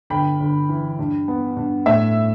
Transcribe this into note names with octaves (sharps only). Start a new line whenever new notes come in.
G1 G5 B5
G1
E3
G2
B3
G2
A2 E5